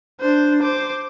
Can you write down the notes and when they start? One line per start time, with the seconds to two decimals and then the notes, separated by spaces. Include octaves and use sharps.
0.20 D4 C5
0.62 C5 D6